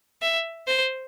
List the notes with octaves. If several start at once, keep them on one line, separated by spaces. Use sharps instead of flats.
E5
C5